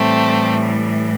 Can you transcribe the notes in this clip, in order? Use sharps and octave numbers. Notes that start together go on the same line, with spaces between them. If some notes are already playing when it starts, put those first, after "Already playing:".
Already playing: A2 E3 G3 A3 C4